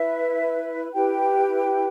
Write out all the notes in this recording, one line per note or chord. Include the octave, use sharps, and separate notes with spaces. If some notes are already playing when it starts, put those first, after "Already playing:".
Already playing: E4 B4 E5
E4 G4 B4 G5